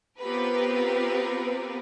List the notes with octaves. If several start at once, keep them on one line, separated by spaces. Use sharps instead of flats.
B3 C4 F4 G4 A#4 B4